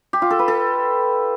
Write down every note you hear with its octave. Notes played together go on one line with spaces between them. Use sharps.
G4
F4
A4
B4
A4